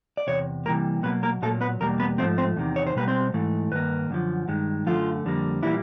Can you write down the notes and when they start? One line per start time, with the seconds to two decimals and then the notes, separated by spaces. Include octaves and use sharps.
0.17 D5
0.27 E2 C3 C#5
0.66 C3 E3 G3 A#3 A#4
1.03 B2 F#3 A#3 B3 B4
1.23 A#3 A#4
1.42 A#2 F#3 A3 A#3 A4
1.61 B3 B4
1.80 E2 B2 G3 A#3 A#4
2.00 B3 B4
2.18 G#2 F3 A3 C4 C5
2.38 C4 C5
2.56 E2 C3 D#3
2.76 C#5
2.87 C5
2.96 B2 G3 A#3 B4
3.08 C4 C5
3.34 G#2 E3 A3
3.72 G2 D#3 A#3 B4
4.10 F#2 D3 F3
4.48 G2 D#3 G#3
4.86 F#2 D3 F3 A3 F4
5.25 F2 D3 G3 A#3
5.63 A#2 E3 G3 A#3 E4